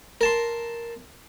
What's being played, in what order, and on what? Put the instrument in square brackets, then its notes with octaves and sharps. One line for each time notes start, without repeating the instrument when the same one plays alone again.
[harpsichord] A#4 A5 C6